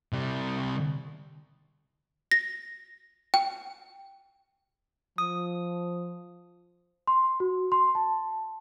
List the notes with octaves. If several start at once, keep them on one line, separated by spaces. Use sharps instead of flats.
C3 G3
A#6
G5
F3 D#6
C6
F#4
C6
A5